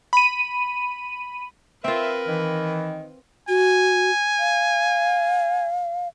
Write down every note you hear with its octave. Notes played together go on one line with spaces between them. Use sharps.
B5 D#7
C4 F4 A#4 B4 E5
D#3 E3
F#4 G#5
F5